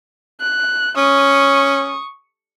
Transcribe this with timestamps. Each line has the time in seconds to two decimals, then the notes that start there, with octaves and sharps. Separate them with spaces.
0.41 F#6
0.97 C#4 C#6 D#6